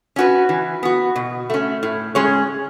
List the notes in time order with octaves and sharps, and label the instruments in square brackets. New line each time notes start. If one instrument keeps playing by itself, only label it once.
[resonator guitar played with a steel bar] C#4 F#4 B4
E3
B3 F#4
B2
A3 C#4
A2
G#3 C#4 G#4 C#5